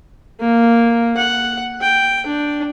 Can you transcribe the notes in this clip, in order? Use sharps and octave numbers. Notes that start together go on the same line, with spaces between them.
A#3
F#5
G5
D4